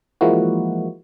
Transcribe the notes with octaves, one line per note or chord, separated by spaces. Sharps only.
E3 F3 G#3 A#3 E4 F#4